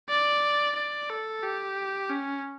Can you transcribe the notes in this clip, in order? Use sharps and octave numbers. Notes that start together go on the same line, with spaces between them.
D5
D5
A4
G4
C#4